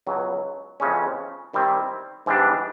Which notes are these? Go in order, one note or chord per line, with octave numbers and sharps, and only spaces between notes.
C#2 B2 F#3
F2 C#3 E3 G#3 C#4
D#3 G3 C4 E4
G#2 E3 G3 B3 D4